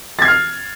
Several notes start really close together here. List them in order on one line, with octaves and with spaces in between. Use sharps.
A6 G#6 C7 F6